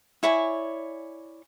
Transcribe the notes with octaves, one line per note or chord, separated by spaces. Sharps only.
E4 C#5 D5 G#5